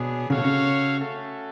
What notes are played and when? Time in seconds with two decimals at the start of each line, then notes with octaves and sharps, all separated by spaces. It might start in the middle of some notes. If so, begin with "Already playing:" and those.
Already playing: B2 B3 D4 G#4 C#5
0.30 C#3 F#4 A4 C#5 F5
0.37 B2
0.44 C#3
0.99 A3 C#4 F#4 A4